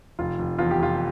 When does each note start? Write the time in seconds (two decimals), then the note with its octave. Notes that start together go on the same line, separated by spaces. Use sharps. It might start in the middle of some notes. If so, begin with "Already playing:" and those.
0.19 F1 F4
0.39 F1
0.58 E2 F4
0.71 G4
0.79 F1 F4